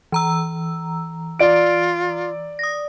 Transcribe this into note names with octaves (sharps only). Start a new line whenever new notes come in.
E3 A#5 E6
F4 D5 D7
D#6 A#6